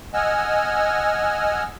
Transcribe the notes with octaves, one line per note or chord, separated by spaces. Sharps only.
D#5 F#5 G#5 E6 F6